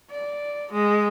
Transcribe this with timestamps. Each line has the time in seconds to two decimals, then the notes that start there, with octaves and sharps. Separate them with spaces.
0.11 D5
0.72 G#3